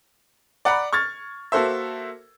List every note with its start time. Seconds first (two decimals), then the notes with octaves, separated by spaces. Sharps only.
0.65 D5 F#5 A#5 B5
0.93 C#6 F6 G#6 A6
1.52 A#3 F#4 A4 C5 E5